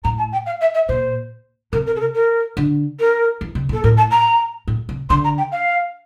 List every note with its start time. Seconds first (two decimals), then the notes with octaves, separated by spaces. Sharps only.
0.04 A2 A#5
0.18 A5
0.32 G5
0.46 F5
0.61 E5
0.74 E5
0.88 A#2 C5
1.72 C3 A#4
1.87 A#4
1.96 A4
2.01 A#4
2.14 A#4
2.57 D3
3.00 A#4
3.41 E3
3.55 C3
3.69 A#2
3.73 A4
3.83 A2 A#4
3.97 A5
4.11 A#5
4.68 A2
4.89 C3
5.09 D3 C6
5.24 A#5
5.38 G5
5.52 F5